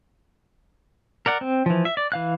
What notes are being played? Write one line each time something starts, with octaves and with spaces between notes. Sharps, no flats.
A#4 D5 F#5
C4
E3 F3
E5
D5
E3 F5 F#6